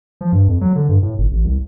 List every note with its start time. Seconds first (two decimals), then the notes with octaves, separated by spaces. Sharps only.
0.21 F3
0.32 G2
0.48 F2
0.61 F#3
0.76 D3
0.89 G2
1.03 A2
1.18 G1
1.31 A1
1.44 C2